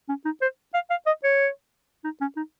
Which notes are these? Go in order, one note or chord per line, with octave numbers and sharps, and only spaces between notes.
C#4
D#4
C5
F5
F5
D#5
C#5
D#4
C#4
D#4